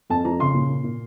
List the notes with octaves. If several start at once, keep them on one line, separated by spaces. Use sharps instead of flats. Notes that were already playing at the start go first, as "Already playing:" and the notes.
F2 A5
F3 A#5
C#3 C6
A#2
A#2
A#2